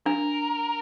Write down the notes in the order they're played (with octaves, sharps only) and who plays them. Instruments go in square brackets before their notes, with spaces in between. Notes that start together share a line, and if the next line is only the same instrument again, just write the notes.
[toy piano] D4 [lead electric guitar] A#4